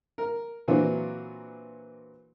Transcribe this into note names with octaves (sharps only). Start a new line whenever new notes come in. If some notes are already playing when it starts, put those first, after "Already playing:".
A#4
A#2 E3 F#3 C4 D4